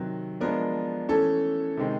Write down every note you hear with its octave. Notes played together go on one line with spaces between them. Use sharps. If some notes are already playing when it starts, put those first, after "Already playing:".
Already playing: C3 D#3 F#3
F3 G#3 B3 D4 A#4
E3 A3 C#4 A4
C3 D#3 G#3 C4